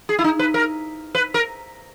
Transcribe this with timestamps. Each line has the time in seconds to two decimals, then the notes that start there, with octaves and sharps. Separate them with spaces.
0.09 G#4
0.19 E4
0.24 D#4
0.39 B4
0.54 A#4
1.15 B4
1.34 A#4